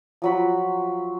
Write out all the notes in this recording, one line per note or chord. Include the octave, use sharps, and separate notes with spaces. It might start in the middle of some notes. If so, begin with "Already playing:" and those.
F3 F#3 B5